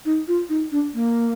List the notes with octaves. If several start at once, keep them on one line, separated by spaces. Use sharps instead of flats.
D#4
F4
D#4
D4
A#3